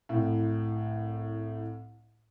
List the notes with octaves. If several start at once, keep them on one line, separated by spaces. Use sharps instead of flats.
C2 A2